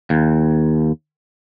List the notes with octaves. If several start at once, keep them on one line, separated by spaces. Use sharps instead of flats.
D#2